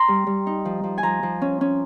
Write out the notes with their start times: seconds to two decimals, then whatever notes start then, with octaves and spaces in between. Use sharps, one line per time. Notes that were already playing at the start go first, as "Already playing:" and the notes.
Already playing: A#5 C6
0.08 G3
0.27 G3
0.47 D#4
0.65 F3
0.84 F3
0.98 G#5
1.03 F3 A#5
1.23 F3
1.42 C#4
1.61 C#4